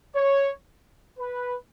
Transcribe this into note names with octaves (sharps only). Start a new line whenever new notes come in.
C#5
B4